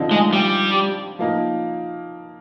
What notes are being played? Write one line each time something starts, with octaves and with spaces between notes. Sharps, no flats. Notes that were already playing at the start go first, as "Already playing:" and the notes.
Already playing: D3 F3 C4 D#4
G#3
G3
F3 A#3 D#4